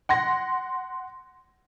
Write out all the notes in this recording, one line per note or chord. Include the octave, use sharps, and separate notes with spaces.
F#5 C6 A#6